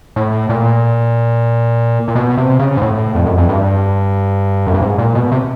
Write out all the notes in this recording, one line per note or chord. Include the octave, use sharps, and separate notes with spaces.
A2
A#2
A#2
B2
C3
C#3
G#2
A2
F2
F#2
F2
G2
F#2
G2
G#2
A#2
B2
C3